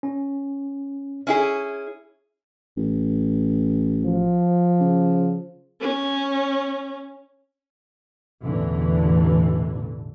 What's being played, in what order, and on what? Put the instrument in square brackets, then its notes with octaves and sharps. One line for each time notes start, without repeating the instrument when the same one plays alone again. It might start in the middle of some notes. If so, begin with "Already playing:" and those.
[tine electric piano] C#4
[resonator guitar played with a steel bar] C#4 E4 G#4
[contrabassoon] A1
[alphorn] F3
[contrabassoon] C#3
[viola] C#4
[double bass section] A1 E2 B2 D3 E3